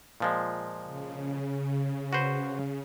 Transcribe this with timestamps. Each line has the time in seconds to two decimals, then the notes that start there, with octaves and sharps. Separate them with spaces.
0.20 A#2 F3 G#3
0.84 C#3
2.13 F#4 B4 C5